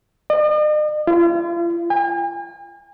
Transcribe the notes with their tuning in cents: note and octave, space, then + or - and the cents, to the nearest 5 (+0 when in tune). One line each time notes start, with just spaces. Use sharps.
D#5 -45
F4 -40
G#5 -45